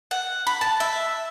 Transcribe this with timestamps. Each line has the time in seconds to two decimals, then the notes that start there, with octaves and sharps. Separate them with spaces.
0.11 F#5
0.47 B5
0.61 A5
0.80 E5